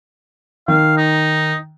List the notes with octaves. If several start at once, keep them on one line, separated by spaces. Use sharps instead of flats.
D#3 F5
D#4